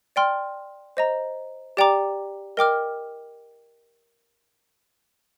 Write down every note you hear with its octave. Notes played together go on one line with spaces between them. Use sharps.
D5 G5 C6 F6
C5 D#5 A#5
G4 D5 G5 A#5 D6
A#4 D#5 G5 D6 F6